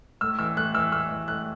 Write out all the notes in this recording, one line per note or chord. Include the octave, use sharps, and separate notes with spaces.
A2 E6
E3 E6
A2 F#6
E3 E6
A2 E6
E3
A2 F#6